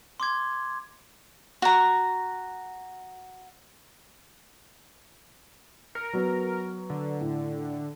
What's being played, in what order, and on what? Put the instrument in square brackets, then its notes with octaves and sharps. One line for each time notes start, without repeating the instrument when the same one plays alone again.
[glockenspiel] C6 D6 G#6
[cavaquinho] F#4 A#5
[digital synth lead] A#4 [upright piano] C#7
[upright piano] F#3 B3 F#4
[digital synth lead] D3
[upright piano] A2